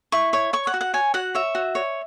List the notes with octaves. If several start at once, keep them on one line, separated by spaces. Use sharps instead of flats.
E4 C#6
C#5 C#6
C#5 C#6
F#5
F#4
F#5
C#5 G#5
F#4 F#5
C#5 E5
F#4
C#5